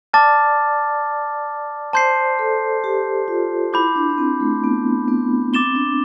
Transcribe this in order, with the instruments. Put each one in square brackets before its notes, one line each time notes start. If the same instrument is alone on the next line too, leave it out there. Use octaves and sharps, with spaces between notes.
[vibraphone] D5 [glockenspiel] A5 D6 F6 A6
[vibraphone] C5 [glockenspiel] A5 C6 G6 C7
[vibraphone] A4
G4
F4
[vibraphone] E4 [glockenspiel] B5 D6 G6
[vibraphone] D4
D4
C4
A3
B3
B3
[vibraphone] C4 [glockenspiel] D6 A6 E7 G7
[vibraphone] D4